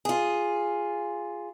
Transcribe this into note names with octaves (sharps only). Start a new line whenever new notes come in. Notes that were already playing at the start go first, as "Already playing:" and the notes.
F4 G#4